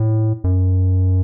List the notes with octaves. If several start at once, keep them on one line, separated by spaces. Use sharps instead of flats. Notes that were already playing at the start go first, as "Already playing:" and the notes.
Already playing: A2
F#2